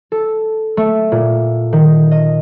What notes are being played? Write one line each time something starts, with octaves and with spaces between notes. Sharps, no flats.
A4
A3
A#2
D#3
D#5